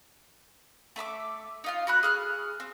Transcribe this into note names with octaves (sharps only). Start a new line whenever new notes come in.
A3 E5 B5 D6
D#4 F4 F5
F#4 B5 F#6
G#4 F6 F#6
C4